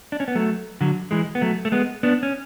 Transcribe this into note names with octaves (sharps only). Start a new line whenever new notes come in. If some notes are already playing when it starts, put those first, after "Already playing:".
D4
C#4
B3
F#3 A3
D3 F#3
E3 G#3
B3
F#3 A3
A3
G#3 B3
B3 D4
C#4